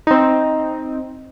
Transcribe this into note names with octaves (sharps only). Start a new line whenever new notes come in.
C4 D#4